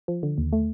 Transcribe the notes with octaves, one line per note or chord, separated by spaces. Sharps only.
F3
D3
D#2
A3